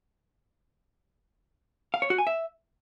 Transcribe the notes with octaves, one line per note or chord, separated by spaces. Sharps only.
F5
C#5
F#4
G#5
E5